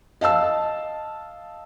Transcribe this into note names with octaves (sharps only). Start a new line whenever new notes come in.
D#5 F5 A5 E6